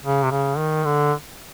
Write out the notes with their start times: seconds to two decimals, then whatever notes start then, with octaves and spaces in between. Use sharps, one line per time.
0.04 C#3
0.23 C3
0.31 C#3
0.58 D#3
0.85 D3